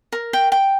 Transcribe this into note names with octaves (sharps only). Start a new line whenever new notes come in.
A#4
G5
G5